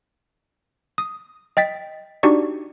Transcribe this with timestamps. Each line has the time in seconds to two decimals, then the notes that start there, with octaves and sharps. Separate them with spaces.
0.98 D#6
1.57 D#5 G5 A6 B6
2.23 D4 D#4 F#4 G4 D5 C#6